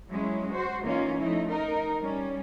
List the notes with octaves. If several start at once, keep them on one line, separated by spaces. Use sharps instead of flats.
F#3 G#3 C#4 E4
F#4 C5
E3 A#3 C#4 D#4 F4
F3 A3 D#4 E4
D#4 A#4
G3 C#4